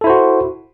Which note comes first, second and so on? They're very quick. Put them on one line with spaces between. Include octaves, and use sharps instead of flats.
A4 E4 C5 F#4